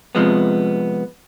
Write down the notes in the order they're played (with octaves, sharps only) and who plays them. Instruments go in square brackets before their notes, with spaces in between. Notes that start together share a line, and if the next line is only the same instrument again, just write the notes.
[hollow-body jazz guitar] C3 F3 G#3 B3